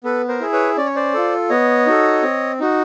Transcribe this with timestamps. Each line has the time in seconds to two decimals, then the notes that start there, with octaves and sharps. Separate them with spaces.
0.04 B3 A4 B4
0.28 A#4 C5
0.40 E4 G#4
0.53 B4 C#5
0.77 C#4 D5
0.86 C#5
0.96 C5 D5
1.14 F4 A4
1.50 B3 C#5 D#5
1.86 D#4 F#4 A4
2.23 C4
2.60 D#4 F#4